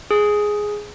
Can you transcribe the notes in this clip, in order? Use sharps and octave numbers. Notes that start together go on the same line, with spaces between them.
G#4